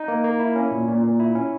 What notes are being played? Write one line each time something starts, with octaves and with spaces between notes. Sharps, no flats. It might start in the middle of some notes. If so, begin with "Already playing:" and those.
Already playing: D#4
A#3
A#3
E4
C#4
A#2
A#2
A#2
E4
C#4